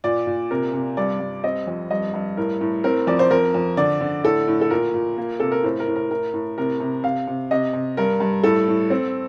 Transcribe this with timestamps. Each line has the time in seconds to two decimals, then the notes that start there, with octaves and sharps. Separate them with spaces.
0.04 A#2 D5
0.27 A#2
0.51 C3 A#4
0.73 C3
0.97 G2 D5
1.20 G2
1.44 C4 D#5
1.67 F2
1.91 G2 D#5
2.14 G2
2.37 A2 A#4
2.61 A2
2.84 C4 A#4
3.07 F2 D5
3.19 C5
3.30 F2 A#4
3.54 F2
3.77 D3 D5
4.01 D3
4.24 A2 A4
4.47 A2
4.61 A4
4.70 A#2 A#4
4.94 A#2
5.18 A#3
5.40 C3 A4
5.52 A#4
5.63 A2 C5
5.80 A#4
5.87 A2
5.96 A#4
6.10 A2 A#4
6.33 A2
6.58 C3 A#4
6.80 C3
7.03 C3 F5
7.27 C3
7.51 C3 D#5
7.73 C3
7.97 G2 A#4
8.20 G2
8.43 A2 A4
8.68 A2
8.90 C4